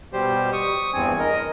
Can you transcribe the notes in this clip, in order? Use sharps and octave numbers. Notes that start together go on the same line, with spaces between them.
B2 G3 G4 C5
C#6 D#6
E2 G2 C4 G#5
A#4 D#5